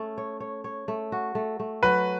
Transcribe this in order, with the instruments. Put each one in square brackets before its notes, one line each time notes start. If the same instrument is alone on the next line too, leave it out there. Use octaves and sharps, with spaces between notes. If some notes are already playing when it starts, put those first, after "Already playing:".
Already playing: [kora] A3 C#4
C#5
C#5
C#5
A3
F#4
A3
A3
[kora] F#3 [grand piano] B4